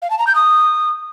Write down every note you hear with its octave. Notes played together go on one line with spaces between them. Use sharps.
F5
A5
A#5
G6
D#6